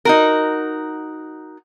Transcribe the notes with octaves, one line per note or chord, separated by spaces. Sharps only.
D#4 F#4 A#4